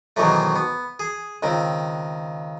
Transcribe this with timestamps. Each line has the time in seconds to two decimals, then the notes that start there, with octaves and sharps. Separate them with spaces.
0.16 G#2 B2 D#3 E3 F#3 A3
0.56 B3
0.99 G#4
1.43 C#2 D#3 C4